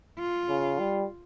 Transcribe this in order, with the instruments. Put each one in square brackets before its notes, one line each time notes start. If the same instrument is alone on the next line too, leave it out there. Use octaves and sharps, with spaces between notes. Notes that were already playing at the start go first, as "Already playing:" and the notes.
[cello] F4
[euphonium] C#3
G3